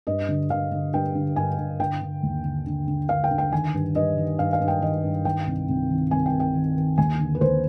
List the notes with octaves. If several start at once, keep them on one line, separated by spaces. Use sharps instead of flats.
G2 D#5
D3
D3 F5
D3
G2 G5
D3
G2 G#5
G2
D3 G5
D3
D#2
D3
D3
D3
D3 F5
G5
D3
G5
D#3 G#5
G2
G2 D#5
D#3
G2 F5
F5
G2
G5
D#3 D#5
G2
D#3 G5
C2
C2
D#3
C2 G#5
G5
C3
G5
D#3
D#3
D#2 G#5
D3
B4
D#2 C5